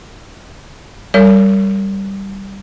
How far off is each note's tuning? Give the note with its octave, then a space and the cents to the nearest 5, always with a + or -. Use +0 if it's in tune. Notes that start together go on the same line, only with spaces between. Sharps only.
G3 +0 A#4 -40 C#5 +30